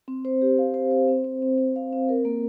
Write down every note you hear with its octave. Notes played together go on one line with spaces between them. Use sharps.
C4
C5
G4
F5
C5
C5
C4
C4
C4
C4
F5
C4
A#4
A#3